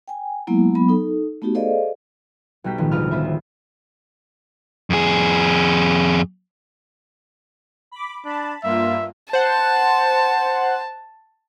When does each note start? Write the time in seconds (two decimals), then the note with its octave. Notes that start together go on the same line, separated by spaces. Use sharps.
0.08 G5 G#5
0.47 F#3 G#3 A#3 B3 E4
0.75 F#3 B3 B5
0.89 D#4 A4
1.42 A3 B3 D#4 F#4 G4
1.55 G#4 A4 C5 D5 D#5 F5
2.64 B1 G3 F#4 G5 B6
2.78 A1 B2 D#3 F3 G#3
2.91 D2 F4 B4 D#5 F6
3.11 B3 B4 C5 E5
3.24 D#3
4.90 F2 G#4
7.92 B5 D6
8.25 D4 A5 B5
8.63 G2 A#3 F4 E5
9.33 C5 F#5 A5